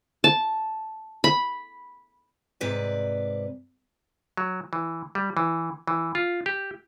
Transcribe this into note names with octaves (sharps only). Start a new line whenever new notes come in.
A5
B5
G#2 C3 B4 D5
F#3
E3
G3
E3
E3
F4
G4